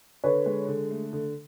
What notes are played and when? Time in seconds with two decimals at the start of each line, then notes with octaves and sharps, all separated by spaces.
0.24 D3 B4 C#5
0.46 G#3
0.68 D3
0.91 A3
1.13 D3